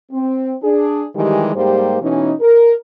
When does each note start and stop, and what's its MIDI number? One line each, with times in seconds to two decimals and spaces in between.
0.12 0.54 60
0.63 1.07 62
0.63 1.07 68
1.16 1.55 51
1.16 1.55 52
1.16 1.55 55
1.16 1.55 56
1.16 1.55 67
1.55 1.97 44
1.55 1.97 55
1.55 1.97 58
1.55 1.97 67
1.55 1.97 72
2.02 2.34 47
2.02 2.34 52
2.02 2.34 61
2.02 2.34 63
2.41 2.75 70